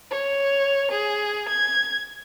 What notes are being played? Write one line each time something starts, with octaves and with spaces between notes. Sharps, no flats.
C#5
G#4
G#6